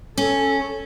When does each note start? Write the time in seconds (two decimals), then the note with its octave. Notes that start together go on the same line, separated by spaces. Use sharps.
0.18 C#4 A4